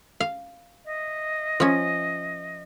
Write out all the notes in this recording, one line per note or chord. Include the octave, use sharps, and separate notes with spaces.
F5
D#5 E5
F3 C#4